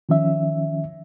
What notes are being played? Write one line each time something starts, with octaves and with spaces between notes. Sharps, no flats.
D#3 F3 C#4 E5